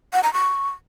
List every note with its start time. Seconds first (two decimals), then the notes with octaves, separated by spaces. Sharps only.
0.13 F#5
0.23 A#5
0.34 C#6